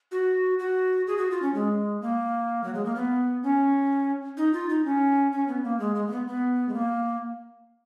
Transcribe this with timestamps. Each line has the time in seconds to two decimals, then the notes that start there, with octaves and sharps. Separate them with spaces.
0.12 F#4
0.59 F#4
1.07 G#4
1.18 F#4
1.31 F4
1.42 C#4
1.54 G#3
2.02 A#3
2.64 F#3
2.75 G#3
2.85 A#3
2.95 B3
3.43 C#4
4.37 D#4
4.53 F4
4.69 D#4
4.85 C#4
5.32 C#4
5.48 B3
5.64 A#3
5.80 G#3
5.95 G#3
6.08 A#3
6.12 B3
6.27 B3
6.69 G#3
6.74 A#3